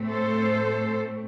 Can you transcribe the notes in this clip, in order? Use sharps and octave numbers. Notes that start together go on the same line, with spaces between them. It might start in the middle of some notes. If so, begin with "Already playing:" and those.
Already playing: A2 A3 C4
A4 C5